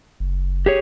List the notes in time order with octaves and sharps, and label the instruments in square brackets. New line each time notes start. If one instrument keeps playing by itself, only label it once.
[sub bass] F#1
[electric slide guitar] G4 G#4 C#5